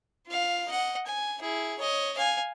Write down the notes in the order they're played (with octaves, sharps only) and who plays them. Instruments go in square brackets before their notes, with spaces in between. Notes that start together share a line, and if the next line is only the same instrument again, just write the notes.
[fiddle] F4 F5
D#5 F#5
G#5
E4 G#4
C#5 D#5
F5 G#5